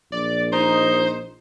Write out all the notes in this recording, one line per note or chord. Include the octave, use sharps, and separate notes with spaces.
A#1 D5
D#4 C5